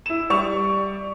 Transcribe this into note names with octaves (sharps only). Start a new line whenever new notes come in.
E4 E7
G3 D5 C#6 F7